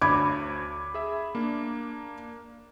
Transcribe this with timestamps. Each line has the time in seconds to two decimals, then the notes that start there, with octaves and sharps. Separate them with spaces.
0.02 D2 D4 C#5 B5 D6 G#6
0.94 G#4 E5
1.35 A#3 D4